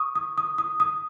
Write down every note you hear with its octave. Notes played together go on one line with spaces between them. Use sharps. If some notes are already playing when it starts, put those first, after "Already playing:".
Already playing: C#6 D#6
D#6
D#6
D#6
D#6